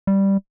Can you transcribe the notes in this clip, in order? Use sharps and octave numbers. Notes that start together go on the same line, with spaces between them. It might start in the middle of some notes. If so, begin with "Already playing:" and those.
G3